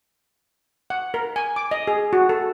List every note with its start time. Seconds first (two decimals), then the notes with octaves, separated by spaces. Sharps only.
0.90 F#5
1.14 A#4
1.36 G#5
1.56 D6
1.71 D#5
1.87 G#4
2.13 F#4
2.29 A4